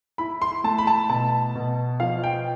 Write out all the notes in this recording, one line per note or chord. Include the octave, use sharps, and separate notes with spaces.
E4 B5
C6
A3 A5
B5
A5
B2 A5
B2
F3 F5
G5